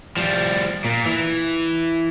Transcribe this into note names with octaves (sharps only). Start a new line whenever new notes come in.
F3 G3
A#2
E3